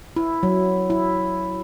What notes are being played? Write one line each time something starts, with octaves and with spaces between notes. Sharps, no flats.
E4
F#3
E4